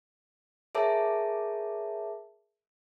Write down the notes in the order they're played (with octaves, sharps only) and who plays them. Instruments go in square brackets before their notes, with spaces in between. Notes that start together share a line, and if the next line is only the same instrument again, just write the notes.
[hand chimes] G#4 A#4 C#5 E5 A5 D6